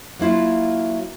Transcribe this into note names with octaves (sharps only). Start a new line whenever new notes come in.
F#3 A#3 E4 F4